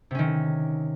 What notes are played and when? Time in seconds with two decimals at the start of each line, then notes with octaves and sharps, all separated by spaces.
0.11 C3
0.15 C#4
0.19 D#3